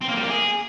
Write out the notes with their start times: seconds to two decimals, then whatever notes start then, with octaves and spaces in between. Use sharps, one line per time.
0.01 C4
0.08 A#3
0.15 G3
0.23 A#3
0.30 G#4